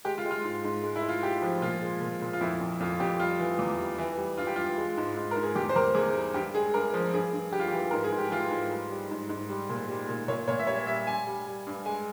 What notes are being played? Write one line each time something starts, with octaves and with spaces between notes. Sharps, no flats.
G#3 G4
F4
G#3
F4
G#2
G#2
G#3
E4
G#3
F4
G#3 G4
F3
A#2 F4
G#3
A#2
A#2
F4
F2 E4
F2
F2 F4
F2 G4
G3 F4
E3
E2
G3
E3
G3
G2 F4
G4
G2 F4
G#3
G#2
G#2
G#2 A#4
G#4
E2 G4
C5
E2 A#4
E2 G#4
G3
G2 G4
G#3 G#4
G2 A#4
F3
G2 G#4
G2
G3 G4
F4
E3 G4
G#2 A#4
G#4
G#2
G4
E3 F4
G#2
G3
G3
G#2
G#2
G3
A#2
G3
A#2
A#2 C#5
A#2 C#5
E5
G3 C#5
G3 E5
G3 G#5
G3
G3
G2
G#3 G#5